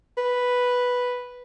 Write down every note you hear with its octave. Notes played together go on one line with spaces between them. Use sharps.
B4